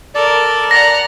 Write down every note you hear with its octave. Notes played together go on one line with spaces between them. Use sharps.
A4 A#4 D5
F#5 A#5 A#6